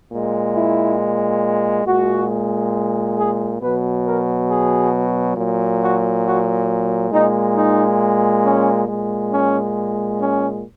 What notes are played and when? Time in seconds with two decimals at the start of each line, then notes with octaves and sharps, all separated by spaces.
0.10 A#2 G#3
0.54 E4
1.85 A#2 G#3 F#4
3.17 G#4
3.61 B2 F#3 B4
4.05 A#4
4.49 G#4
5.36 A#2 F#3
5.81 F#4
6.25 F#4
7.11 A#2 G#3 D#4
7.56 D#4
8.43 C#4
8.88 A#2 G#3
9.31 C#4
10.19 C#4